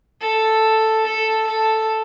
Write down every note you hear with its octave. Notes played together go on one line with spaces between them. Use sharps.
A4
A4
A4